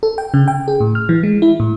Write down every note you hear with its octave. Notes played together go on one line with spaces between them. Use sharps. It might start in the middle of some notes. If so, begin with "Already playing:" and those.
A4
G5
C#3
G5
G#4
A2
F6
E3
G#3
E4
A2